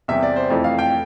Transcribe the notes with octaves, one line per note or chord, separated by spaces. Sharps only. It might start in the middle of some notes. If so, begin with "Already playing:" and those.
E2 C3 G3 E5
D5
C5
F2 E3 A3
F5
G5